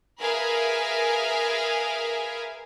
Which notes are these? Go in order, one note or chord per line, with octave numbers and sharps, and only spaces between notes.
G#4 A#4 B4 E5 F5 G#5